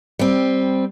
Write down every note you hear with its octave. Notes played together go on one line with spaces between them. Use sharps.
G3 C4